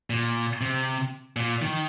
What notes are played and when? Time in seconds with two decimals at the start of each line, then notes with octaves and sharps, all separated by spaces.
0.10 A#2
0.61 C3
1.36 A#2
1.62 D#3